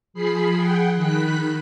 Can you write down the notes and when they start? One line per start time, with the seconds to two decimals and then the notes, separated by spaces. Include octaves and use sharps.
0.14 F3 G#4 B5 C7
0.56 G#4 F#5 G5
0.95 D#3 B5 F#6 B6